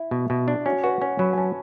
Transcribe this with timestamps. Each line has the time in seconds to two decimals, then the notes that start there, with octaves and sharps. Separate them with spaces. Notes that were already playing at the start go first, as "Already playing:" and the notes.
Already playing: E4
0.11 B2
0.30 B2
0.48 D4
0.66 C#4 F#4
0.84 F#4 B4
1.02 C#4 C#5
1.19 F#3 B5
1.33 G#5
1.38 C#4 A5